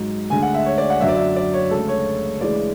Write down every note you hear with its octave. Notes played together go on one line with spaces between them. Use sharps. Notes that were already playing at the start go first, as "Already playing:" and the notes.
Already playing: G#2 F#3
D2 D3 G#3 G#5
F#5
E5
C#5
D5
F#5
F#2 D3 F#3 E5
D5
E5
D5
C#5
D2 C#3 G#3 A4
C#5
D2 C#3 E3 G#3 D5